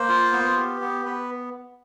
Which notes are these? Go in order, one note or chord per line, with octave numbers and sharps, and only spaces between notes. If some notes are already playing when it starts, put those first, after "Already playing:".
Already playing: A#3 C5
F4
B3
G4
B3
B3 B4